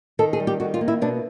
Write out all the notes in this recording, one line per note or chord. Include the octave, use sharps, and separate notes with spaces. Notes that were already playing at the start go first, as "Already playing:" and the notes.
D#3 A4
G#4
G3
G4
D#3 F#4
F4
A#3
E4
B2 D4